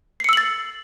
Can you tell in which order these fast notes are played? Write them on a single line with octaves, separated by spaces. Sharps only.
C7 C#7 E6 F#7 A6